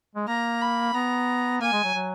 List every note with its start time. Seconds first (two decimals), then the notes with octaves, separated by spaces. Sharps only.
0.16 G#3
0.27 A#3 A#5
0.61 B5
0.94 B3 A#5
1.61 A#3 G#5
1.73 G#3
1.84 F#3
1.95 F#3